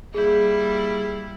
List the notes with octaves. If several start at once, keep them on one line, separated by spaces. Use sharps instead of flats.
G3 A#3 E4 G#4 G6